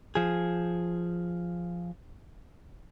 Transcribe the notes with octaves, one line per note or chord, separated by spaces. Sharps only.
F3 G#4